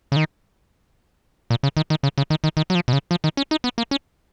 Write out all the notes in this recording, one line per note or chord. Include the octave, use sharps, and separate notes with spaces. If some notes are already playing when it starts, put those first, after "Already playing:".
C#3
D#3
A#2
C#3
D#3
D#3
C#3
C#3
D#3
D#3
D#3
F#3
F3
B2
C#3
F3
D#3
C#4
D#4
B3
A#3
C#4